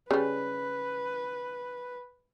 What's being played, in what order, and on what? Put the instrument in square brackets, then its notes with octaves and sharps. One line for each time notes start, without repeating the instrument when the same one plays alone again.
[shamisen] C#3 G3 [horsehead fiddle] B4